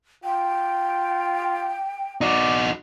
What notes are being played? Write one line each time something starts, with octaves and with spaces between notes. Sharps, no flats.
F4 G5
D#4 F#4 D5